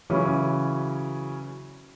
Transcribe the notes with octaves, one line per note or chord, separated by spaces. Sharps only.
C#3 E3 F#3 C#4